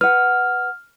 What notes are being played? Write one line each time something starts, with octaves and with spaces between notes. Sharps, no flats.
B4 F#5 F6